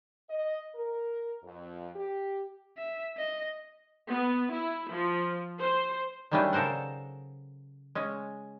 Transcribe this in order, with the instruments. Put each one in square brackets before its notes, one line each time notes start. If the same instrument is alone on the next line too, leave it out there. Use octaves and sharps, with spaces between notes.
[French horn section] D#5
A#4
F2
G4
[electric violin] E5
D#5
[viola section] B3
E4
F3
C5
[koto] D#3 F#3 G3 A3 C#4 D4
C#3 A4 A#4 C5 F#5
G#3 C#4